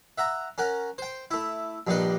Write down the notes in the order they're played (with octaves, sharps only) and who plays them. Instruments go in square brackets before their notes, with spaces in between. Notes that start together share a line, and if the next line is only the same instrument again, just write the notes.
[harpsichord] E5 F#5 A#5
C#4 A#4 F#5
C5 G5
A3 E4
A#1 G2 A#2 G3 D4 D#5